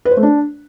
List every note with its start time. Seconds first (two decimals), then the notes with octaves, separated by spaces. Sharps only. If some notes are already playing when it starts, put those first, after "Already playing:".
0.05 B4
0.11 C5
0.17 A3
0.23 D4